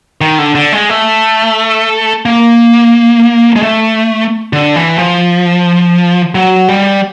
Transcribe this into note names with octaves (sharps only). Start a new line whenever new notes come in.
D#3
D3
D3
G#3
A3
A#3
G#3
A3
D3
E3
F3
F#3
G3